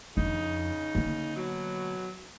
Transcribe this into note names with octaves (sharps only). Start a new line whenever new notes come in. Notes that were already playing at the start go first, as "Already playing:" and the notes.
F2 C#3 D4 D#4
D3 A#3
B2 F#3